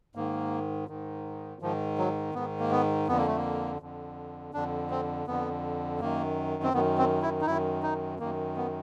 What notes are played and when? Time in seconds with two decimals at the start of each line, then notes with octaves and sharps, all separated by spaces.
0.15 G#2 D#3 A#3
0.88 G#2 D#3
1.62 G#2 D#3 F3
1.98 F#3
2.35 G#2 D#3 B3
2.60 A#3
2.71 B3
3.08 F2 D3 B3
3.17 A#3
3.27 A3
3.37 A#3
3.81 F2 D3
4.54 F2 D3 D4
4.90 C4
5.27 F2 D3 B3
6.00 F#2 D#3 A#3
6.63 C4
6.73 F#2 D#3 B3
6.98 C4
7.22 E4
7.41 D#4
7.46 F#2 D#3 E4
7.83 D#4
8.19 F#2 D#3 A#3
8.56 B3